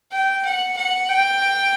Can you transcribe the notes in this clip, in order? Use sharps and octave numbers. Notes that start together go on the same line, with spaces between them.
G5
F#5
F#5
G5